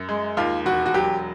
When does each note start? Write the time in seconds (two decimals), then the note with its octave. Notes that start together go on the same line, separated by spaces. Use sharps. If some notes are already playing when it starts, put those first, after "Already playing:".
Already playing: F#2
0.09 G#3
0.37 D#2 F4
0.65 E1 F#4
0.86 F#4
0.94 F#3 G4